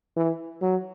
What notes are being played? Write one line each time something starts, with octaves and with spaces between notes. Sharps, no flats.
E3
F#3